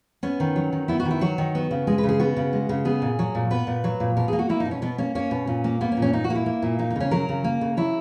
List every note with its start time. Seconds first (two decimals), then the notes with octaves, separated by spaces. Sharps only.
0.23 B3 C#4
0.40 D#3
0.56 F#3
0.73 D#3
0.88 B3 E4
1.00 F#4
1.05 D#3
1.10 E4
1.21 F#3 F#4
1.38 D#3
1.55 B3
1.71 C#3
1.87 G#3 G#4
1.98 B4
2.03 C#3
2.09 G#4
2.19 B3 F#4
2.36 C#3
2.53 G#3
2.69 C#3
2.85 B3 G#4
3.02 A#2
3.19 F#3
3.35 A#2
3.51 B3 B4
3.67 A#2
3.84 F#3
4.00 A#2
4.17 B2 A#4
4.28 A#3 G#4
4.39 F#4
4.49 A#3 E4
4.60 D#4
4.65 B2
4.71 C#4
4.82 B2 B3
4.98 A#3 C#4
5.15 A#3 C#4
5.31 B2
5.47 A#2
5.64 A#3
5.81 A#3 B3
5.92 C#4
5.97 A#2
6.02 C#4
6.13 A#2 D#4
6.24 F#4
6.30 A#3
6.35 E4
6.46 A#3
6.62 A#2
6.79 A#3 D#4
6.90 D#4
6.96 C#3 C#4
7.11 F#3 A#4
7.29 C#3
7.44 A#3
7.61 C#3
7.77 F#3 E4